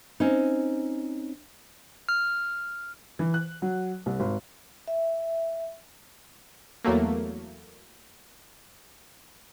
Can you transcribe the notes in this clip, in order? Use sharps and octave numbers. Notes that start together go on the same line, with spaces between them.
C4 C#4 D#4
F6
E3
F#6
F#3
C2
G#1
E5
E2 F#3 A3 A#3